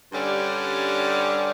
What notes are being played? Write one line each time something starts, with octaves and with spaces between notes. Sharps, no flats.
G2 D3 G3 C#4